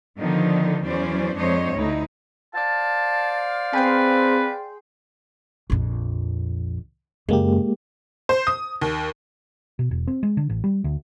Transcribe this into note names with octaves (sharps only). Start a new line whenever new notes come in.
D3 D#3 F3 B3 D#4
E2 E3 F#3 C#4 C5 D5
F2 G#3 D4 C5 C#5 D#5
D2 D3 D#4 E4
C5 D5 F5 A5
C4 G#4 B4 G5 C6
A#1 F2
F#2 C#3 G#3 A#3 G4
C5
D#6
D#2
B2
E1
C4
G#3
D3
A1
G3
D2